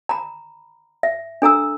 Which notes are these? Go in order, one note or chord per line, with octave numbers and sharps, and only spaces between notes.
A#5 B5
E5
D4 A4 A#5 E6